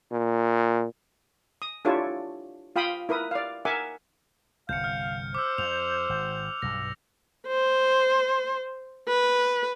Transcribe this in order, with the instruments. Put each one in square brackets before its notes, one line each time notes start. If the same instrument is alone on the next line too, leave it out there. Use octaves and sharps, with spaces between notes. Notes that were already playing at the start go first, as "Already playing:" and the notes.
[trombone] A#2
[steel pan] D#6
D4 E4 F4 G4 A4 C#5
F4 F5 G5 B5 D#6
E4 A#4 B4 D#6
D5 F5
A#4 E5 F#5 G#5 D6
[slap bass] G1 C2 [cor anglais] F5 [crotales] G6 C#7
[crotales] F6
[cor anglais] C5 [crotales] D6 E6
[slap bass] F2 [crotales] F7
[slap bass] G#1
[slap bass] B1 G2 G3 [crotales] A#6
[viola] C5
B4